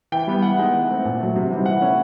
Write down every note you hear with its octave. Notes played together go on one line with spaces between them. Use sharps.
E3 G5
G3 B3
E3 F#5
G#3 B3 D#4
E3
A3 C4
A#2
F#3 A3
C3
E3 G3 C4 D#4
E3 F#5
A3 C#4 E4